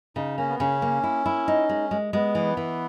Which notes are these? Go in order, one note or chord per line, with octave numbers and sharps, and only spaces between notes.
C#3 D#4
A#3 C#4
B3
C#3 C#4
A#3
E4
E4
D#4
G#3
G#3
G#3 B3
E3
E3